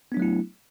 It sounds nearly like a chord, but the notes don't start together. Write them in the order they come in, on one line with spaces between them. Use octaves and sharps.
B3 D4 F#3 A3 E4